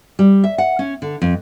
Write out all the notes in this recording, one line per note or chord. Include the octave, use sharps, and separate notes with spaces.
G3
E5
F#5
C#4
D3
F2